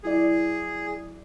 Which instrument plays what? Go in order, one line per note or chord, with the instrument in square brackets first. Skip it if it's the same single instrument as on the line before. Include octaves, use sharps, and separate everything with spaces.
[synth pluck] F#3 E4 D5 [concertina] G#4